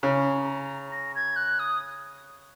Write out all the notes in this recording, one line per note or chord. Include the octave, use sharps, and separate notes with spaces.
C#3 A#5
A#6
G#6
F#6
D#6